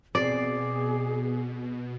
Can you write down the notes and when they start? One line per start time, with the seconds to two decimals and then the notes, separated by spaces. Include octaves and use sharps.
0.15 B2 C4 G#4 D5 C7